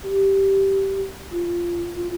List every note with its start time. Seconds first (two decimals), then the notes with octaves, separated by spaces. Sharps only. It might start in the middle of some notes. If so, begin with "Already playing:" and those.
0.03 G4
1.31 F4
1.95 F4